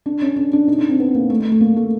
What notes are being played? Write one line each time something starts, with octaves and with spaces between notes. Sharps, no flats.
D4
C#4
D4
D4
D#4
D4
C4
B3
A#3
A3
A3
A3
A#3
A3